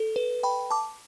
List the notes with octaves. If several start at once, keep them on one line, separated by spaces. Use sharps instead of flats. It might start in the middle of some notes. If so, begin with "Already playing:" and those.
Already playing: A4
B4
G5 B5
A5 D6